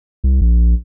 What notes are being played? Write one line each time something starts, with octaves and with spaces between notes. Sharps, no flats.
C2
A#1